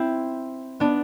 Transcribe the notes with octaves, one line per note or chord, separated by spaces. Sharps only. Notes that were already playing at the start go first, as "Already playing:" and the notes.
Already playing: C4 E4
B3 D4